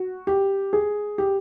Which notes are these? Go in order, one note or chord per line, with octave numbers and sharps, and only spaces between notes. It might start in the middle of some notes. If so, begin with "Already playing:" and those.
Already playing: F#4
G4
G#4
G4